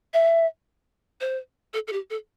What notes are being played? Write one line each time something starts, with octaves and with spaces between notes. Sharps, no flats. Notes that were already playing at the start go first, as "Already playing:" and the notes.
E5
C5
A4
A4
G4
A4